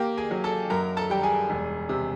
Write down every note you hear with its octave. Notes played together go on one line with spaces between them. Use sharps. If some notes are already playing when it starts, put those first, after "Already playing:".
Already playing: A#3 G4 G5
G#4 G#5
F#3
A4 A5
F#2 A#4 A#5
A4 A5
G3 G5
G#4 G#5
E1
C3